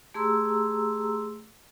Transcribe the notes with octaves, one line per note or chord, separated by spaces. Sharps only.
A3 G4 G#4 A#5 C6 E6